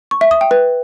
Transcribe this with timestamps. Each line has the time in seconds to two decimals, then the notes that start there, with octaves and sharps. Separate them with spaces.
0.11 C#6
0.21 E5
0.31 D#6
0.41 G5
0.51 B4